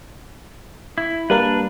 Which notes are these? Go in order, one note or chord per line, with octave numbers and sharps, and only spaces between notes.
E4
G3 A#3 D4 A#4 B4